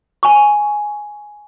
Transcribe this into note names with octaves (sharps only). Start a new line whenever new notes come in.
G#5 C#6